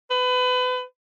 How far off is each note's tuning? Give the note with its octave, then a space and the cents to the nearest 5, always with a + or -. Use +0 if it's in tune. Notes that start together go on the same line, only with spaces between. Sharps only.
B4 +30